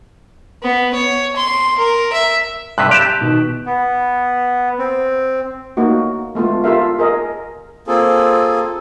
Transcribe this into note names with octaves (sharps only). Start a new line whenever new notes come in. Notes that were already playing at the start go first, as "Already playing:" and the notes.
B3
C#5
C6
A#4
E5
G2 C3 F#6 B6
G4 A5 F#6
B2 D#3
B3
C4
A3 A#3 D#4 F#4
G#3 A3 B3 F4
F4 G4 A4 A#4 E5 F5
G#4 A#4 D#5
A#3 C4 F4 G#4 A4